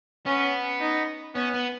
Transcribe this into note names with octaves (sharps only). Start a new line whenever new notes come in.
B3 C#4
D#4
B3 C#4
B3